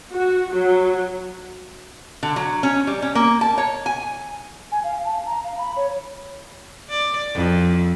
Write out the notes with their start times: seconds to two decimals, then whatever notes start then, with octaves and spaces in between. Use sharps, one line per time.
0.13 F#4
0.53 F#3
2.23 D3
2.36 F#3
2.63 C#4
2.87 G3
3.02 C#4
3.15 A#3
3.41 A5
3.58 C#5
3.86 G#5
4.72 G#5
4.84 F5
5.05 A5
5.26 A#5
5.44 F5
5.58 B5
5.76 C#5
6.89 D5
7.34 F2